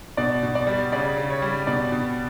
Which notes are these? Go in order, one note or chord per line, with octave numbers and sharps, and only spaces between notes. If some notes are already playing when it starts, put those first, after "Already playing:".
B2 D5
B2
D5
G3
C#3 D5
C#3
C#5
G3
B2 D5
B2